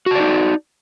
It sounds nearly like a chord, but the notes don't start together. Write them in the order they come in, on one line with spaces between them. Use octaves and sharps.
F#4 A5 D5 D#4